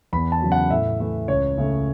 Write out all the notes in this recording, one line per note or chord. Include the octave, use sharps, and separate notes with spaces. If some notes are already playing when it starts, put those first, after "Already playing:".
E2 B5
A5
C#3 F#3
F#5
A2 E5
E3 A3
C#2 C#5
C#3 A3